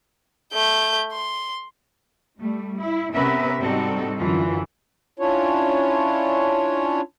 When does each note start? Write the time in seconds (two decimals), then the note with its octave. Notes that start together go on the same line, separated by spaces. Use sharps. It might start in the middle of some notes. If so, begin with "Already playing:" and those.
0.53 A3 G6
1.13 C6
2.39 G3 A3
2.79 E4
3.14 C3 B3 C#4 A#4 B4 E5
3.59 G#2 G3 C4 D#4 F#4 A4
4.18 F#2 D3 E3 F4
5.19 C#4 D4 E4 F4 C#5